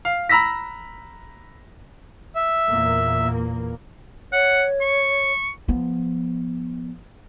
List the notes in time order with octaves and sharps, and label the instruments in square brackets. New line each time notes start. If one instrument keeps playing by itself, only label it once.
[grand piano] F5
A#5 B5 E6 A#6 B6
[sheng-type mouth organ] E5
[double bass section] E2 A#2 A#3
[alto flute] C#5 [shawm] F#5
[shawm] C#6
[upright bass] F3 B3